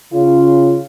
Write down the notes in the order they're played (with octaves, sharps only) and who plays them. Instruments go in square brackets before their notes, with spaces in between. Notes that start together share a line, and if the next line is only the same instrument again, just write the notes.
[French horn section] C#3 F4